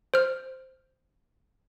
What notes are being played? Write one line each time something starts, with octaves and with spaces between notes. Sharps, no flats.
C5 F6